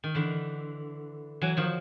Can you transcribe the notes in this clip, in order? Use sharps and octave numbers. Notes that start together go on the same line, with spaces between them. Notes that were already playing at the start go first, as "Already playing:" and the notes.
D#3
D3 E3
E3 F#3
D#3 F3